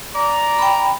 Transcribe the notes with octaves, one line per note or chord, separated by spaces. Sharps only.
D5 A#5
G5 B5